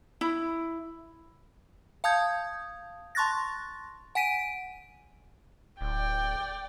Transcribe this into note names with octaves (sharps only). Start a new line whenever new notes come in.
E4
F5 A5 D#6 G6 G#6
A5 C6 C#6 F#6 A6 A#6
F#5 G#5 B6 D7 D#7
D1 D5 G5